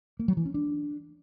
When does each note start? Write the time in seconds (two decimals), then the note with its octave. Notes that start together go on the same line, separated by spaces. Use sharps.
0.19 A#3
0.28 F#3
0.37 E3
0.46 C#4
0.54 D4